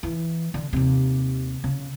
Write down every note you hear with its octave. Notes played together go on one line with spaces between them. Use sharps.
E3
D3
D#2 C3
C#3